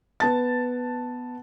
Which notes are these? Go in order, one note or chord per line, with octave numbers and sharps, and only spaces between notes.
B3 A5 A6